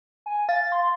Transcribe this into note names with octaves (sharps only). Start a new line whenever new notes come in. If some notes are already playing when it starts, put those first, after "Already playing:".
G#5
F5 A6
C6